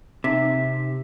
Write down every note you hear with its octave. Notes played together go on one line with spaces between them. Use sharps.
C3 D#4 B6